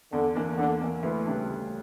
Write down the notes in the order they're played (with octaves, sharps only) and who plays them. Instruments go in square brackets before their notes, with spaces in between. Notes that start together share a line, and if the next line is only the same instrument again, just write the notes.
[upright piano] E2 [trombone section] D3
[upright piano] E3 A#3 D4
[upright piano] E2 [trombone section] D3
[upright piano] E3 A#3 D4
[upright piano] D2 [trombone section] E3
[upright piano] C#3 G3 D4
D2